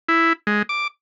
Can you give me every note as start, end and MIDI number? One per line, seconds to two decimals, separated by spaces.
0.09 0.33 64
0.47 0.62 56
0.69 0.87 86